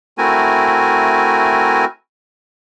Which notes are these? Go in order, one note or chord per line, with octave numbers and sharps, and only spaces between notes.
A3 C4 E4 F#4 A#4 G#5